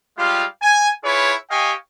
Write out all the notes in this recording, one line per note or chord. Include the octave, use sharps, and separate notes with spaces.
G3 G#3 F4 G4 F5
G#5
E4 F4 G#4 B4 C#5
G4 D#5 F5 G5 G#5 C#6